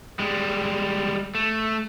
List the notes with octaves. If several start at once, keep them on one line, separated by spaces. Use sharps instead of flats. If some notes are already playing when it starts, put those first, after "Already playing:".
G3 G#3
A3